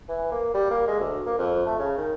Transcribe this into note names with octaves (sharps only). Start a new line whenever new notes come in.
E3
A#3
G3
A#3
G#3
D2
A#3
F2
A3
C#3
D#3